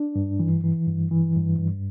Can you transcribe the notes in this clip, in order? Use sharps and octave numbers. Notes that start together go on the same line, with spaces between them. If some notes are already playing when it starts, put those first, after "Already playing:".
Already playing: D4
G2
E3
E3
G2
E3
G2
G2